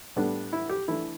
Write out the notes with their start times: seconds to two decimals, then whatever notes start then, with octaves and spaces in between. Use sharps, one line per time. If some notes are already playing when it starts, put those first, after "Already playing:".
0.16 A2 G3 B3 D4
0.53 E4
0.70 G4
0.88 E3 A3 D4 E4